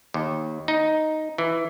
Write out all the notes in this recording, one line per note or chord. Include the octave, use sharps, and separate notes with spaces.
D#2
D#4
E3